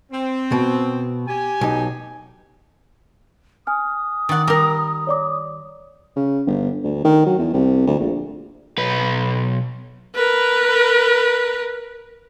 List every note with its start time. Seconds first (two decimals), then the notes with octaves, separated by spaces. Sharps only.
0.11 C4
0.52 B2
1.27 G4 G#5
1.61 B1 D#4
3.67 G#5 D#6 F6
4.29 D#3 D5 F#5
4.48 G3 A#4 A#5
5.07 C#5 D5 D6
6.16 C#3
6.47 G1
6.84 D2
7.05 D#3
7.26 F#3
7.38 E2
7.54 C2
7.87 D2
8.00 A#1
8.78 B1 B4
10.15 A#4 B4